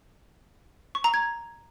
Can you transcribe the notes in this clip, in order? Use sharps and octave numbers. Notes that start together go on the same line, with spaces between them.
C#6
A#5
G#6